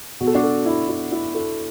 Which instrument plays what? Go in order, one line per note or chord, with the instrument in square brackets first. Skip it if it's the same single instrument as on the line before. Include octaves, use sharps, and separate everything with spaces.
[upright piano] B2 [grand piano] F#4
[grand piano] A4
D4 F#4
[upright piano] A4
E4
E4
E4
A4